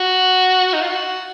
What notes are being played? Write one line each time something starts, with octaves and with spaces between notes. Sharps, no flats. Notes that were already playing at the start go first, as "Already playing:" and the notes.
Already playing: F#4
D#4
F4
F#4